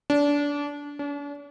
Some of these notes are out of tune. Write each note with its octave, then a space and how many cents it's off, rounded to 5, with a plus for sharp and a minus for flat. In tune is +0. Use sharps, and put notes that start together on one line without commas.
D4 -25
D4 -45